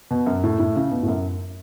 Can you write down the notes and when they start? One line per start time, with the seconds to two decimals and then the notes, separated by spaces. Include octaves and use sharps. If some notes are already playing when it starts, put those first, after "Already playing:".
0.11 B2
0.26 F#2
0.44 A2
0.60 A2
0.76 C#3
0.91 B2
1.03 A2
1.08 F#2